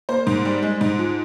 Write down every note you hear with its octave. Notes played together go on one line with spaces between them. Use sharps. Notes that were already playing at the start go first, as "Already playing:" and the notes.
A#3 C5
G#2
G3
G#3
G#2
F3